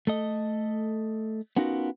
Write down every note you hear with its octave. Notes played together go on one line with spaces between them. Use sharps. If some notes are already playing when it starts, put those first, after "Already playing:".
A3 A4 D#5
B3 C#4 D#4 F4 F#4 A#4